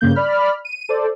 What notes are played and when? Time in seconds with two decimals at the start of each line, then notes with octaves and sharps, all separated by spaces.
0.01 G2 C#3 A#3 G6
0.15 D5 B5 F6
0.65 D#7
0.89 A4 C5 D5